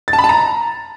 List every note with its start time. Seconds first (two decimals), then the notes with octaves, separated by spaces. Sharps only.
0.08 A6
0.13 A5
0.19 B5
0.24 A5
0.29 A#5